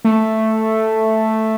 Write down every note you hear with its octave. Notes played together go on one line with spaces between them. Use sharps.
A3